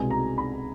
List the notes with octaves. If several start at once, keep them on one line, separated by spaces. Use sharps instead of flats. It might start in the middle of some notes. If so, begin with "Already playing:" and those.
Already playing: C2 B2 G#3 B3 G#5
A#5
B5